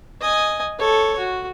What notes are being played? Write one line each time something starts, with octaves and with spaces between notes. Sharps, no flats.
D#5 G#5
A4 C#5
F#4